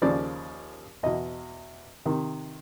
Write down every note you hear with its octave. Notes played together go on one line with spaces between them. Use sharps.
D#2 C#3 F3 D5
E2 B2 D#5
C3 D#3